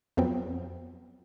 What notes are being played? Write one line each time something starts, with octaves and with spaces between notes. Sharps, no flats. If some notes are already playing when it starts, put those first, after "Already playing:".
F2 F3 F#3 B3 C4